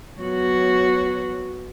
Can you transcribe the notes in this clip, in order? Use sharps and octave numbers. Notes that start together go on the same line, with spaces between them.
F#3 B3 F#4